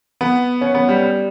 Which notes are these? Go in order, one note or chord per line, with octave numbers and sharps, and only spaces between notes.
B3
C#4
B3
G3
G3